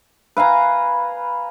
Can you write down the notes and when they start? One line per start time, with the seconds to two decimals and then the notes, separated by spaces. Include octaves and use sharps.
0.37 B4 F5 G#5 A#5